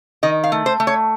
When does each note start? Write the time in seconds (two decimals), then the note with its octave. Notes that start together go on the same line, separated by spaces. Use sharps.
0.23 D#3 D#5
0.44 F5
0.52 A3
0.66 C5
0.80 A3
0.87 C#5